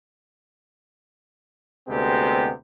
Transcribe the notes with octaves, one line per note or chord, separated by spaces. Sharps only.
D2 C3 G#3 B3 C4 G4